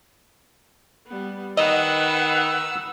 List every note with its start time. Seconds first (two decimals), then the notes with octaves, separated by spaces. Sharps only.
1.07 G3 B3
1.57 D#3 B4 D#5 F#5 E6